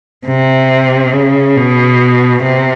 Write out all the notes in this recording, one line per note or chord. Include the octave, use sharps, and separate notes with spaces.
C3
C#3
B2
C3